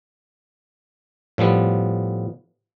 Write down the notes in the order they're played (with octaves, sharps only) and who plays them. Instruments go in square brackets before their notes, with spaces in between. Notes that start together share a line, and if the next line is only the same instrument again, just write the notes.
[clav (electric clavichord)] A2 F3 G3 B3